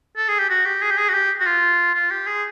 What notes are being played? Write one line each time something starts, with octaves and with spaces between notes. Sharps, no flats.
A4
G#4
G4
F#4
G4
G#4
G4
G#4
F#4
G4
F#4
F4
F4
G4
G#4